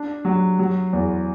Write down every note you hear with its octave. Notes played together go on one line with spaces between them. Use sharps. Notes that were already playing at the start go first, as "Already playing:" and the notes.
Already playing: D4
F#3
F#3
E2